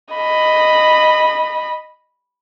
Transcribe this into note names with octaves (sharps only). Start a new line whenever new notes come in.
D#5 B5